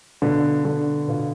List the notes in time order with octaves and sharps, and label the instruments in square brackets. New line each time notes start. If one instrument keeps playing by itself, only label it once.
[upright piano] B2 B3 F4 [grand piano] D3
[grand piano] D3
[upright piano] B2 B3 F4